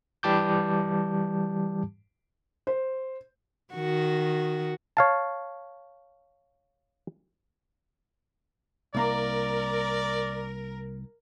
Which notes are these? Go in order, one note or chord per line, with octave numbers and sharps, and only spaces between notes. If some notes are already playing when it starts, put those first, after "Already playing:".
E3 G3 G4 A5 D6 G6
C5
D#3 F#4
C#5 F5 A5
C2 A#3 A#4 D5 A#5